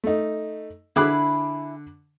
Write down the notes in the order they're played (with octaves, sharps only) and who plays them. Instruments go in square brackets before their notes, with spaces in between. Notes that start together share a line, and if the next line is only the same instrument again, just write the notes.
[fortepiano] A3 D#4
[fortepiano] D3 D6 F#6 [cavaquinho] E4 G#4 B5